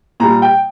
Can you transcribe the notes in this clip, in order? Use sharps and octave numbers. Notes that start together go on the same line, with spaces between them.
A#2 G3 A#5
G5